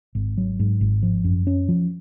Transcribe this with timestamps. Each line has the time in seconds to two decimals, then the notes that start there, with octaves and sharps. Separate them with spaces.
0.15 G#1
0.38 F#3
0.59 G#2
0.81 G#1
1.03 F3
1.24 F#2
1.47 C#4
1.69 F3